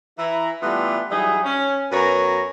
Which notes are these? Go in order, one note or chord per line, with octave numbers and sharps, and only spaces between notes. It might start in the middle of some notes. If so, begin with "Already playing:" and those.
E3 E4 A#5
E3 G3 A3 B3 D4 F4
E3 F#3 G3 D#4 G#4
C#4
F#2 B3 B4 C#5 A#5